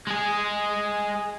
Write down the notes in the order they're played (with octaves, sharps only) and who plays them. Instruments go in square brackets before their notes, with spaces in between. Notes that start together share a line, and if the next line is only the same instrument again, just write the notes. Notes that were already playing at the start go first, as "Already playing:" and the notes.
[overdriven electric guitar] G#3 G#4